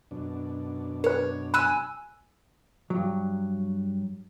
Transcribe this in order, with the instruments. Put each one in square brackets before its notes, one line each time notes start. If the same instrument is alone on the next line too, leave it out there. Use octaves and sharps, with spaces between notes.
[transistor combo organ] F#2 B2 D4
[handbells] A#4 B4 [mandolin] C#5
[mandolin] G#5 E6 F#6 [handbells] B5
[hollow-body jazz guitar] G2 F#3